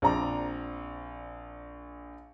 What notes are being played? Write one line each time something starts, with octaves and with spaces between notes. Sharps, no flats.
A#1 C4 D5 A#5